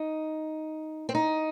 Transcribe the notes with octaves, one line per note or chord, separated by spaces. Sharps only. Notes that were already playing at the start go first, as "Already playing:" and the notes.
Already playing: D#4
C4
D#4